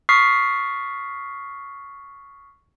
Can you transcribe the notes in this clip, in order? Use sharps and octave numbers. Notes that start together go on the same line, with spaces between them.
C#6 D#6 F6 A6 B6 C7